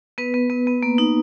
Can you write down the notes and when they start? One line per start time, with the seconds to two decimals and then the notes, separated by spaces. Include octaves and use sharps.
0.18 B3 B4
0.34 B3
0.50 B3
0.67 B3
0.83 A#3
0.98 D#4